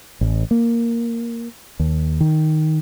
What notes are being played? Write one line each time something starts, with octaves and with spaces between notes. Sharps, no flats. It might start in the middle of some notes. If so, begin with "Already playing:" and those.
A1
A#3
D#2
D#3